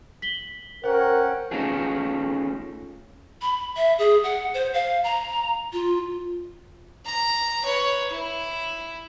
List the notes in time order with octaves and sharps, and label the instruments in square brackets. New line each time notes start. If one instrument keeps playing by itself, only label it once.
[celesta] B6 F#7 G7
[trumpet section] C#4 F#5 G5 [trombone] A#4 [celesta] C5
[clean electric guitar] A3 C#4 D#4 F4 G#4
[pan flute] B5
E5
G#4
F#5
C5
F5
A#5
F4
[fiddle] A#5
B4 C#5
E4